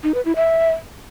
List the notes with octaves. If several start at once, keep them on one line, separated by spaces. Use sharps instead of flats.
D#4
B4
E4
E5